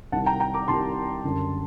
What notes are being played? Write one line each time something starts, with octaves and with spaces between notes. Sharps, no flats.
C2 C3 D#3 G3 F#5 A5
G5 A#5
G5 A#5
A#5 D6
C2 C3 D#3 G3 A5 C6
F#1 F#2 D3 G3